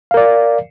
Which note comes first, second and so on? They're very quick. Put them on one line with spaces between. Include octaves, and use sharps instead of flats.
F5 A#4 D5